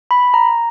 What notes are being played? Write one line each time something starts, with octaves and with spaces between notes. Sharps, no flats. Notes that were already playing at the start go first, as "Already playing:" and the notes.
B5
A#5